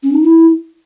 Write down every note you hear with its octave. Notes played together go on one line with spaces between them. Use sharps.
C#4
D#4
E4